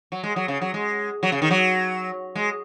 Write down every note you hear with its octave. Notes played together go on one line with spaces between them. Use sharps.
F#3
G#3
F#3
C#3
F#3
G#3
F#3
C#3
D#3
F#3
G#3